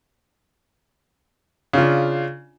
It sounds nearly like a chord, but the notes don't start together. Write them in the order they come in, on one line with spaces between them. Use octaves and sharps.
C#3 F4 D4